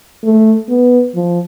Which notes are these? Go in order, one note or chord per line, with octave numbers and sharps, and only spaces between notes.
A3
B3
F3